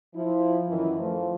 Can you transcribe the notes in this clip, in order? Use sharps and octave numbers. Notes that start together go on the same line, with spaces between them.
F3 E4
F#2 D#3 E3
F3 A3